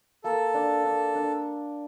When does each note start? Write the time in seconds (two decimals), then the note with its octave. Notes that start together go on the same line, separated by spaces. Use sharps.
0.24 A#3 A4
0.54 D4
0.84 D4
1.15 D4